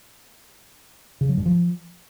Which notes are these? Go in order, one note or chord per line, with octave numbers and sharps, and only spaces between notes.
C#3
F#3
G2
F3